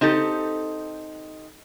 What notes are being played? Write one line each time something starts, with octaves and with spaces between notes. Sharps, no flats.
C4 D#4 G4 A4